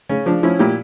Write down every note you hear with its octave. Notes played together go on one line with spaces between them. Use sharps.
C#3 C#4
F3 D4
F3 C#4 E4
A#2 E4 G4